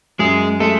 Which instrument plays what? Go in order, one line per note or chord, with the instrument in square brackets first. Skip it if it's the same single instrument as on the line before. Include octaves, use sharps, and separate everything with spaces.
[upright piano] F#2 [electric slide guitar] G#3 G#4
[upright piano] G#3 [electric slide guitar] A3 A4